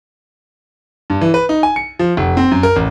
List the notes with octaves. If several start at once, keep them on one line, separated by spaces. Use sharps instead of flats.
G2
E3
B4
D#4
G#5
C#7
F3
F1
C4
F#2
A#4
A1